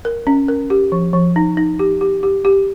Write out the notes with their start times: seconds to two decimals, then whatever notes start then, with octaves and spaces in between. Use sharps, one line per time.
0.05 A#4
0.27 C#4
0.48 A#4
0.70 G4
0.92 F3
1.13 F3
1.36 D#4
1.57 D#4
1.79 G4
2.01 G4
2.23 G4
2.45 G4